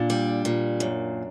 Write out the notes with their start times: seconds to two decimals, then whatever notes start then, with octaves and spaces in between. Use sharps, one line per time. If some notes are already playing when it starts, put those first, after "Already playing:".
Already playing: A#2 D4
0.10 G3
0.45 A#2
0.80 F#2